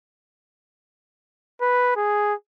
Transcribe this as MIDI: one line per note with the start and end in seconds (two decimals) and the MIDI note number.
1.61 1.91 71
1.96 2.34 68